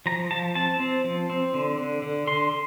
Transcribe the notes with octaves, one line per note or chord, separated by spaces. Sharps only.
F3 A#5
F3 A5
C4 A5
C4
F3
C4
D3
D3
D3
D3 C6